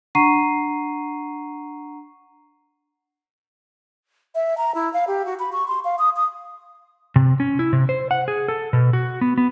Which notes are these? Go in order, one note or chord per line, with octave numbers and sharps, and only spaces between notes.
D4 F#5 A#5 C#6 C7 D#7
E5
A#5
E4
F5
G4
F#4
B5
C#6
C6
F5
D#6
D#6
C3
C#4
E4
C3
C5
F#5
G#4
A4
B2
F#4
B3
B3